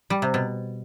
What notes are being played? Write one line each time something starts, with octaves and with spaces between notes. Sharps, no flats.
G3
C3
B2